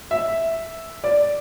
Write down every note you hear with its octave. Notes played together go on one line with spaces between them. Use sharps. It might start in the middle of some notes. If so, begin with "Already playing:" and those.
E5
D5